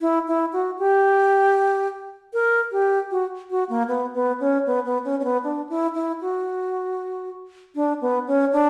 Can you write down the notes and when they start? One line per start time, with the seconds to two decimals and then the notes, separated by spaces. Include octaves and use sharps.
0.01 E4
0.27 E4
0.53 F#4
0.79 G4
2.33 A#4
2.72 G4
3.11 F#4
3.50 F#4
3.69 A#3
3.88 B3
4.14 B3
4.40 C#4
4.66 B3
4.85 B3
5.04 C#4
5.20 C#4
5.24 B3
5.44 D4
5.69 E4
5.94 E4
6.21 F#4
7.75 D4
8.01 B3
8.27 C#4
8.52 D4